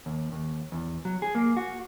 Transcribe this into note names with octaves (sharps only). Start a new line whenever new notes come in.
D#2
D#2
E2
F#3
G#4
A#3
F#4